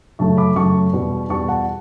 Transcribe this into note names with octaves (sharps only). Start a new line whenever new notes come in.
F#2 C#3 F#3 A3 A5 C#6
B5 D6
F#2 C#3 F#3 A3 A5 C#6
E2 B2 G3
E2 B2 G3 A5 C#6
F#5 A5